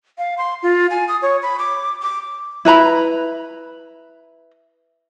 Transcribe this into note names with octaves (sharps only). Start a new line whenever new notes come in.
F5
C6
F4
G#5
D#6
C#5
B5
D6
D6
E4 B4 A#5 B5